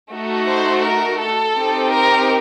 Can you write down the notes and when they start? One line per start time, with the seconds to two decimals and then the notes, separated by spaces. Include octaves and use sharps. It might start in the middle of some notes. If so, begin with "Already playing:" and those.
0.12 A3 D#4 F#4
0.48 C5
0.85 A#4
1.21 A4
1.56 C4 D#4 G4
1.92 A#4